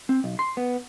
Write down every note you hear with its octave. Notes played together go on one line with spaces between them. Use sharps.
C4
B1
C6
B3